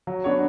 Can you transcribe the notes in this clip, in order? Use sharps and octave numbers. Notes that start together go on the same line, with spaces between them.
F#3
B3 D4 F#4 C#5